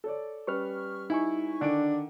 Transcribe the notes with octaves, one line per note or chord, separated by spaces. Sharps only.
A4 C#5 D5
G3 C#4 B4 C#6 F6
D#4 E4 G#5 C#6
D3 D#3 D4 D7